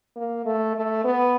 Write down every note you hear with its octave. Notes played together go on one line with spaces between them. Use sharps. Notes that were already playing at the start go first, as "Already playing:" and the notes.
A#3
A3
A3
B3